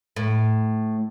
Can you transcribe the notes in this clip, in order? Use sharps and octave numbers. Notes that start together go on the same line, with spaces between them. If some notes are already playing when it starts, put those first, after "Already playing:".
A2